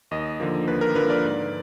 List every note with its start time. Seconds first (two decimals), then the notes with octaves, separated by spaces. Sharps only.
0.11 D#2 D#5
0.40 D3 F3 A#3
0.67 D#2 B4
0.81 A#4
0.95 D3 F3 A#3 B4
1.10 D5
1.23 G#2